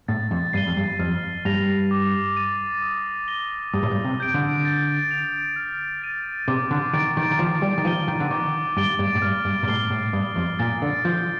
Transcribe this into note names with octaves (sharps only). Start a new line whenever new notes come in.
A2 A6
F2
G2 C7 D#7 G7
F2
G2
F2 F6
G2 A#6 F7
D6
A6 D#7
D#6
A#6 D#7 G7
G2 D#6
A2
G2
C3
G6 D7
D3
A6
D7 F7
F6
A6 D#7
C3 D6
D3
D#3 A6 D7
D#3
D#3
F3 A6
G3
D#3
F3 D#7 G7
D#3
D3
D#3 D6
G2 A6 D7 G7
G2
A2
G2 F6
G2
A#2
A2 C7 G7
A2
G2 D#6
F2
A#2 A6 D7
D3
F3 G6